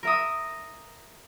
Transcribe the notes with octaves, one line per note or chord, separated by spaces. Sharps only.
A#4 E5 D#6